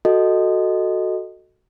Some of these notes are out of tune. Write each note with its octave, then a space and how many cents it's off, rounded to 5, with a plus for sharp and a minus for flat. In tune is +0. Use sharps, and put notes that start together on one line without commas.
F#4 +0 A4 +0 D#5 +0